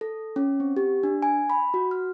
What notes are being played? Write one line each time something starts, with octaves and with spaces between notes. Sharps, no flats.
A4
C#4
C4
G4
D4
G#5
B5
F#4
F6